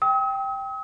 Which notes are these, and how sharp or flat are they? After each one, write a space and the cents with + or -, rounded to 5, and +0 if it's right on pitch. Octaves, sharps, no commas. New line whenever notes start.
G5 +0 D#6 +45